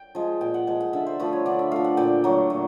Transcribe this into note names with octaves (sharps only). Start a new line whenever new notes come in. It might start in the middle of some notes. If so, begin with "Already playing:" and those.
Already playing: G5
F3 G#3
A#2 G5
F#5
F3 G#3 G5
F#5
D3 E5
C5
F3 A3 B4
C#5
D3 D5
E5
F3 A3 F5
F#5
A#2 G5
F#3 A3
A#2